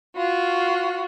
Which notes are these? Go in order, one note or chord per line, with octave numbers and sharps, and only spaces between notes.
F4 F#4